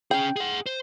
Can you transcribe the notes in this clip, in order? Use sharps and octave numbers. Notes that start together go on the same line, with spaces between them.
C#4 G#4 G5
G#4 F#5
C5